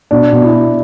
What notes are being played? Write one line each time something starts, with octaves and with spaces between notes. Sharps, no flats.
B2 D4
B2
E4
B2